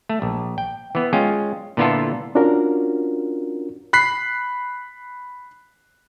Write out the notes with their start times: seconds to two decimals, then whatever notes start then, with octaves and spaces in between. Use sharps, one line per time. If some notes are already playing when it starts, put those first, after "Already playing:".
0.09 A3
0.22 A#1
0.58 G5
0.95 E3 B3
1.13 G#3 C#4 F4 G5
1.77 A#2 D3 B3 E4 F4 A4
2.35 C#4 D4 F4 F#4 A#4
3.93 B5 F#6 B6 C7